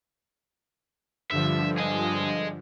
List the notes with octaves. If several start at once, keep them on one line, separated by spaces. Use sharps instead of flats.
G2 D3 F3 E5
G#4 D#5